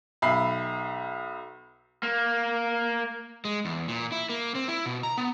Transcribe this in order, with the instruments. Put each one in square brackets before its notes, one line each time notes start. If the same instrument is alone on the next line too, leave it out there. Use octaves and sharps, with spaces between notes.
[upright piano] B1 E5 B5 C7
[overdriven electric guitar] A#3
[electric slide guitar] G#3
E2
A#2
E4
A#3
C4
E4
B2
A#5
B3